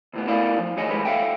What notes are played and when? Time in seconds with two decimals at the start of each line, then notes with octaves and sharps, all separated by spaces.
0.14 D2 A2 B3
0.27 A3 B3 E4 A#4 D5 F5
0.59 F3
0.77 D2 D#3 G#4 C#5 D#5
0.90 A2 D#3 G#3 B4
1.05 A4 E5 F5 G5